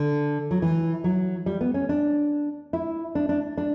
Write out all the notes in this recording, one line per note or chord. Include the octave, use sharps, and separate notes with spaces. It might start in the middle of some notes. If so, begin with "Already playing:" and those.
Already playing: D3
F#3
E3
F#3
G3
B3
C#4
D4
E4
D4
D4
D4